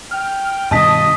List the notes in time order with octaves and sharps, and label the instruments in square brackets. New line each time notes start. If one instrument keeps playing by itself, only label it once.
[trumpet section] G5 [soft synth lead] F6
[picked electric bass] G2 B2 D#3 [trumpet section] D#5 [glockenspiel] G#5 D#6 B6 [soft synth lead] A5